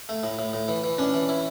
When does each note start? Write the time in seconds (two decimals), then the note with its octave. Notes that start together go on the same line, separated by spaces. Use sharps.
0.09 A3
0.23 A2
0.39 A2
0.53 A2
0.68 E3
0.84 E3
0.98 C#4 D4
1.14 E3
1.29 E4